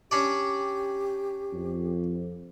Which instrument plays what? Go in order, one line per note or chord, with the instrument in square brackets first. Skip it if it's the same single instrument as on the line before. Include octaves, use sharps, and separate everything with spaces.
[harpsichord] C#4 D4 D5 [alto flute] G4
[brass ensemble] F2